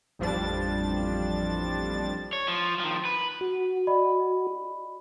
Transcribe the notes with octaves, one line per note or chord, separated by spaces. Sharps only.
A1 F2 F3 G3 D4 A6
C#5
F3
D#3 F3
B4
F#4
D5 D#5 B5